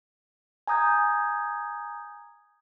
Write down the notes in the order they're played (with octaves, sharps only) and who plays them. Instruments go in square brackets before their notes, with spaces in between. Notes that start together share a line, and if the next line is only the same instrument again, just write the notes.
[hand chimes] G#5 A#5 D#6 G6 G#6